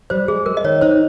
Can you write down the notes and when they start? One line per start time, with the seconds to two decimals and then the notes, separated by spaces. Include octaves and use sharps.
0.10 G3 C5
0.28 G#3 G#4
0.46 G#3 A#4
0.57 D#5
0.64 D#3 C#5
0.81 D#4 C5